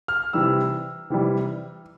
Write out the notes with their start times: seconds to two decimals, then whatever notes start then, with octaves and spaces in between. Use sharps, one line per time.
0.08 F6
0.33 C3 E3 G3 E6
1.10 C3 E3 G3